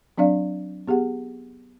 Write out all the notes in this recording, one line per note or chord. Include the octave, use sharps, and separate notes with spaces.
F#3 C4 D4 D5 F5
B3 G4 G#4 F#5